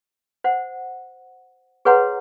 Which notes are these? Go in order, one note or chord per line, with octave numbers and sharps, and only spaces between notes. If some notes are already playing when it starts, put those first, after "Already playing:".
C5 F#5
G#4 B4 C#5 F#5 A#5 C6